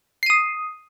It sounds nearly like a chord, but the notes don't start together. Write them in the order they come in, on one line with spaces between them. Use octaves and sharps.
C7 D#7 D#6